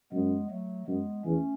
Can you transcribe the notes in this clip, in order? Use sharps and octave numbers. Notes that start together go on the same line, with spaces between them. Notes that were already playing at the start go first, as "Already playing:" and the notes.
F#2 G#3 B3
F#3 A3
F#2 G#3 B3
E2 A3 C#4